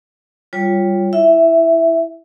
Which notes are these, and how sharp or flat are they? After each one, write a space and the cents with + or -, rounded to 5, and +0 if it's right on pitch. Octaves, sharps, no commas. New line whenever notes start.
G3 +0 F4 +0 C#5 +0
E4 +0 E5 +0